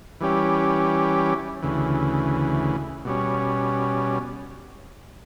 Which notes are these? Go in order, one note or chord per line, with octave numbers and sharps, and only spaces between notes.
E3 G3 C#4 G4
D2 C#3 E3
B2 G3 C#4